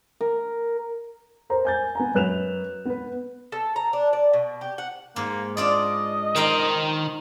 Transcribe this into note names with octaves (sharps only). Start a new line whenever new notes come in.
A#4
A#4 C5 A#5
G#5 G6 A6
B3 G#5 A#5
F#2 B4 F#6 E7 F7
B3 B4
A4
A#5
D4
D5
B2
G4
F#5
G#2 A#3
D4 F4 D5 D#5
D#3 A#4 C5 G5